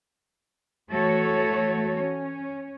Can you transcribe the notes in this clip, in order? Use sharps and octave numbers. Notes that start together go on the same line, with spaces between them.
E3 A3 F#4 A4 C#5
C#4